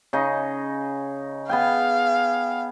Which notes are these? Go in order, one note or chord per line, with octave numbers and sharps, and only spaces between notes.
C#3 D#4 D#5
B3 G#4 F5 G5